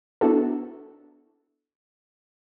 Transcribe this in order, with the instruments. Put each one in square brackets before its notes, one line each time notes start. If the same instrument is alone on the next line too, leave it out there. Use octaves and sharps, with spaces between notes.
[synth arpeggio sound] B3 D4 E4 F#4 A4